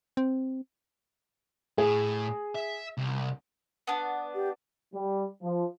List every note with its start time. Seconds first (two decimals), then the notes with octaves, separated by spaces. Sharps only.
0.17 C4
1.78 A2 G#4
2.55 E5
2.98 C2
3.87 B3 D4
4.35 G4
4.94 G3
5.43 F3